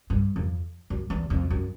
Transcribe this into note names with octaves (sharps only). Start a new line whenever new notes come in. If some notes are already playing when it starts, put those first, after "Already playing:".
G2
F2
F#2
E2
F2
F#2